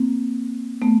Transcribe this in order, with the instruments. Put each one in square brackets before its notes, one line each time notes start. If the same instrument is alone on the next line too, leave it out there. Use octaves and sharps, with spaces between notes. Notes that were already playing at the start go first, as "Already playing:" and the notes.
Already playing: [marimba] A#3 C4
A3 B3